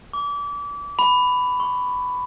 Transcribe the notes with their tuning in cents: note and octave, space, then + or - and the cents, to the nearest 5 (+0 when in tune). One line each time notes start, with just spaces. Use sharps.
D6 -30
B5 +10
C#6 -25